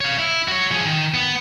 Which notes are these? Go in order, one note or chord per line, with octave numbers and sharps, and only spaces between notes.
C#5 F5
E4
F#4 C#5
F3 G#4
D#3
B3